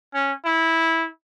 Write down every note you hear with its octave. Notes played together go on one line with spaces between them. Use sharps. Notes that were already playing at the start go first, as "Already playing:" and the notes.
C#4
E4